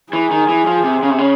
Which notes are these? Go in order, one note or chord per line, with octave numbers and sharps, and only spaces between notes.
E3 G#4
D#3
E3
F3
C3
C#3
C3
C#3